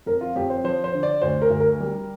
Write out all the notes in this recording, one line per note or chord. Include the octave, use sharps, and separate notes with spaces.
F2 A#4
F4
F2 G4
C5
F3 C5
C5
D3
D5
D2 C5
A#4
D2
A#4
G3